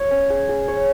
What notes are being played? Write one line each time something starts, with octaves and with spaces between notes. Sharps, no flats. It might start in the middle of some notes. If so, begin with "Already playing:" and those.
Already playing: C#5
C#4
G#4
G#4
C#5